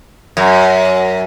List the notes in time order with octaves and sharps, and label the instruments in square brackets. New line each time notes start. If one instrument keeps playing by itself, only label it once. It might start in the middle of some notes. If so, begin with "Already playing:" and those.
[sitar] F#2